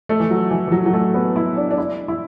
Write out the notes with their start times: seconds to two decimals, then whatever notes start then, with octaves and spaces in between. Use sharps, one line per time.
0.09 A3
0.20 E3
0.31 F#3
0.51 E3
0.68 E3
0.72 F#3
0.86 F#3
0.93 A3
1.14 B3
1.36 E4
1.57 D4
1.71 D4
1.78 E4
2.08 E4